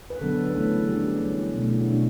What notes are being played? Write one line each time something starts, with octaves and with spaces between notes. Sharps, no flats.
B4
D3 F#3 B3 D4 A4
B4
C#3 E3 A3 C#4 A4
C#3 G3 D4 G4
E3 G3 C#4
B2 F#3 A3 C#4
E4
F#4
B2 A3 D4 E4